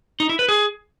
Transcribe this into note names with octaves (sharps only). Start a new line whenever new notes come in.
D#4
E4
B4
G#4